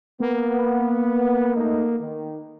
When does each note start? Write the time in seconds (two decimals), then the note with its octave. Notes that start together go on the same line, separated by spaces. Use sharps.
0.20 A#3 B3
1.56 A3 D#4
1.99 D#3